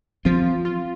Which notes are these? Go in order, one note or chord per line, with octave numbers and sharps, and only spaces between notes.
F3 C4 F4
F4